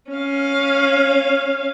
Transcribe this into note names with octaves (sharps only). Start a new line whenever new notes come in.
C#4 F5